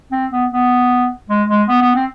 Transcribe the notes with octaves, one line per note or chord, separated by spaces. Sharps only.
C4
B3
B3
G#3
G#3
B3
B3
C4